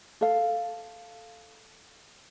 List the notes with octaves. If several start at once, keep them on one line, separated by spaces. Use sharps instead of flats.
A4 F5